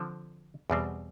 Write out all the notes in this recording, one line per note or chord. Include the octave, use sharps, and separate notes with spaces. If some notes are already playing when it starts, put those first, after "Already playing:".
Already playing: D3 F3 C4
E2 B2 G3 C4